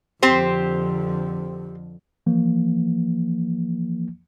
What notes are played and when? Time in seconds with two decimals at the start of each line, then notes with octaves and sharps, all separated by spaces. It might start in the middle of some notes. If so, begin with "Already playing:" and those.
0.22 F2 D3 C4 G4 C5
2.26 E3 F3 A#3